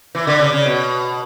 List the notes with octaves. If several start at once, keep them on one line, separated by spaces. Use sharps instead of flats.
E3
D3
C#3
C#3
B2